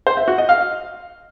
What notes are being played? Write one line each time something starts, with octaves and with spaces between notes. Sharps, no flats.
C5
E5
F#4
D#5
F5